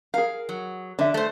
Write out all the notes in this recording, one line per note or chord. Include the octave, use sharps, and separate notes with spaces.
G#4 A#4 F5
F#3
D3 D4 E5
A3 C5